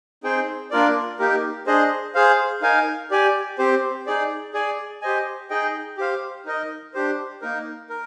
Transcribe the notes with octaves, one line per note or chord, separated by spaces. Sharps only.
C4 D#4 G#4 C5 G5
A#3 D4 F4 A#4 D5
A#3 D#4 G4 A#4
D4 G#4 C5 D#5
G#4 C5 F5
D#4 A#4 F5 G#5
G4 D5 G#5
C4 G4 C5
D#4 G#4 D5
G#4 D5 G#5
G4 C5 D#5 G#5
D#4 G#4 D#5 G5
G4 C5 F5
D#4 A#4 D#5
D4 G4 C5
A#3 D#4 A#4
A#4